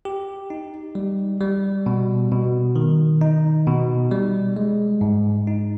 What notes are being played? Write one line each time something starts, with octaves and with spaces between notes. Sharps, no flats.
G4
D#4
G3
G3
B2
B2
D#3
D#4
B2
G3
G#3
G#2
D#4